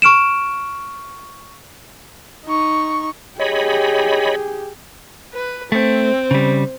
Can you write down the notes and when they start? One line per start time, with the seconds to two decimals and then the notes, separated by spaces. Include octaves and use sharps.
0.02 C#6 F6 D7 E7
2.45 D#4 C#6
3.40 G4 G#4 C#5 D#5 B5
5.34 B4
5.72 A3 C4
6.31 C#3 G3